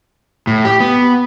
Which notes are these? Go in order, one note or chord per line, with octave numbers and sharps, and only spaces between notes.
A2
G4
B3